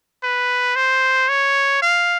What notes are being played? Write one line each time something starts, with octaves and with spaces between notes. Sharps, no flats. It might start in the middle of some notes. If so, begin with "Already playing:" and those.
B4
C5
C#5
F5